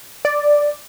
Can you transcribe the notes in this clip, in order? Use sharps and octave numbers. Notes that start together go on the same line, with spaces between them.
D5